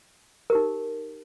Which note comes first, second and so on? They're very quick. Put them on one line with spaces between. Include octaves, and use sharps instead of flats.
A#4 G4 D#4